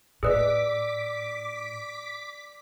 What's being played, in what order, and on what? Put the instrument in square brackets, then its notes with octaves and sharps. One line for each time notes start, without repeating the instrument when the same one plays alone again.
[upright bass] A2 [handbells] G#4 B4 D#5 [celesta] D5 E6 [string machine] D6 B6